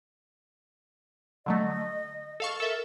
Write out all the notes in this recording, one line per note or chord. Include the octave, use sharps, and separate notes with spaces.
D3 F#3 A3 D#5
A4 F5 C#6
A4 A#4 E5